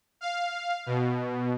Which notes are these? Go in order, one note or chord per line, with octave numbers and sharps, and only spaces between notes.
F5
B2